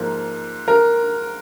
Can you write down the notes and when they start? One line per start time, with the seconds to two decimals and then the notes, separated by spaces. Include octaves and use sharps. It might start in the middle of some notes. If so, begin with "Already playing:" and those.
Already playing: G#2 F3 A#3
0.68 A#4